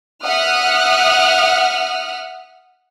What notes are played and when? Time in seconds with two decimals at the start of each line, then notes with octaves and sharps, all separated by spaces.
0.24 E5 F#5 D#6 F6 F#6